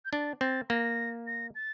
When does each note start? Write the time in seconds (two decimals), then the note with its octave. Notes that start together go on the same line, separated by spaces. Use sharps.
0.05 G6
0.12 D4 A6
0.41 C4 A6
0.70 A#3 A#6
1.27 A#6
1.55 A6